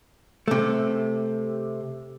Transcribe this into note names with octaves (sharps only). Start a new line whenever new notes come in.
C3 A3